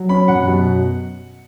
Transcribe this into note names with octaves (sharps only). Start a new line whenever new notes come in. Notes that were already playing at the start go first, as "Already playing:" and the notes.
Already playing: F#3
C#4 B5
F#2 F#5
B2